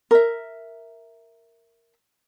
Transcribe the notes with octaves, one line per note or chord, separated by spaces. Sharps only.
A#4 E5